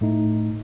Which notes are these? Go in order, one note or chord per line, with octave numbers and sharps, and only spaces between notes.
A2 A3 D#4